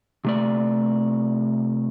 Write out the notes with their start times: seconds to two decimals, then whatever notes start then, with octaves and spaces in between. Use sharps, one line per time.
0.25 C3 A3 D5